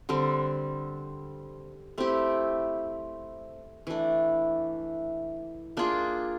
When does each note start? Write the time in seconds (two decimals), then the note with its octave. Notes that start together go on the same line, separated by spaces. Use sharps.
0.09 D3 G3 C4
1.98 A3 C4 E4 G4
3.87 E3 A3 D4
5.77 A#3 D4 F4 G#4